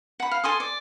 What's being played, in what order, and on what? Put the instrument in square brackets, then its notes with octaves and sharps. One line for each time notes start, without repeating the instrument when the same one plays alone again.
[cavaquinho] F#5 B5
F5
A4 G#5 C6 D#6
D5